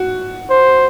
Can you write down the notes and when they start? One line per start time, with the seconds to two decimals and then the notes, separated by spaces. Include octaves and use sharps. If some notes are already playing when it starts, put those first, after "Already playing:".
Already playing: F#4
0.50 C5